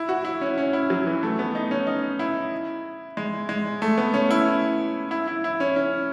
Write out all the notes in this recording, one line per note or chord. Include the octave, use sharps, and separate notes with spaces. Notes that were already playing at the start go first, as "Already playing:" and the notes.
Already playing: E4
F#4
E4
C#4
C#4
E4
F#3
E3
A3
B3
D#4
C#4
D#4
E4
G#3
G#3
A3
B3
C#4
E4
E4
E4
E4
C#4
C#4